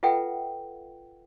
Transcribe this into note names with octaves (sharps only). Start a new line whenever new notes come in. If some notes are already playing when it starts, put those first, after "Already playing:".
F4 A4 B4 E5 F#5 G5